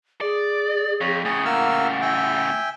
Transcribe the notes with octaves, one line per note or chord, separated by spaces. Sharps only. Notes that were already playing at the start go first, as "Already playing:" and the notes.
G#4 D5
F2 C#5
A2 C#3 G#4
A#3 F#5 E6 F6
E5 G5 G#5